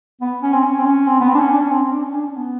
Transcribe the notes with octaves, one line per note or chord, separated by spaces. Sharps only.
B3
C#4
C4
C#4
C4
C#4
C4
B3
C4
D4
C#4
D4
C#4
C4
C4
D4
C#4
D4
C#4
B3